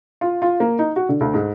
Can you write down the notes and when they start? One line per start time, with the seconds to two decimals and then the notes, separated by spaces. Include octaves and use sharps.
0.21 F4
0.42 F4
0.60 A#3
0.79 D#4
0.96 F#4
1.09 D3
1.20 D2
1.34 G#2